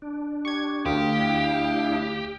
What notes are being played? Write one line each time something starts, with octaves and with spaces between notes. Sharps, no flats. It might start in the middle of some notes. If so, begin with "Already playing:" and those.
D4
G4 C#6 G#6
D2 G4 F5 D#6
D4 E4